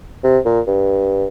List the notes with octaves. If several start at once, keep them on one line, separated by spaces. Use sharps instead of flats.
C3
A#2
G2